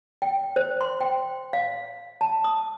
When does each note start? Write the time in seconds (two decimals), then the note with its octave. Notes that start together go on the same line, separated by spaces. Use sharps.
0.22 G5
0.56 C5
0.81 C6
1.01 G5
1.53 F5
2.21 A5
2.44 D#6